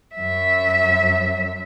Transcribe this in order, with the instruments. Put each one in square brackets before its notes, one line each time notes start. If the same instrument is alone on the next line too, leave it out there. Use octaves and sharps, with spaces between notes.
[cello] F#2 E5